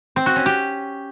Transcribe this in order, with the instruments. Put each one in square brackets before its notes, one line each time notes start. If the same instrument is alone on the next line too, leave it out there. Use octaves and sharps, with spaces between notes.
[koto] C4
F#4
C#4
G4